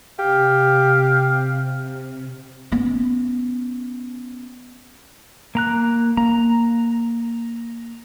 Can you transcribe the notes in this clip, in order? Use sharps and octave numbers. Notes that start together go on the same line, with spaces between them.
C3 G4 F5
B3 C#4
A#3 A#5 F#6
A#3 A#5